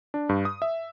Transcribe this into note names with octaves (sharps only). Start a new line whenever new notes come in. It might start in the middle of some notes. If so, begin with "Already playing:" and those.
D4
G2
D#6
E5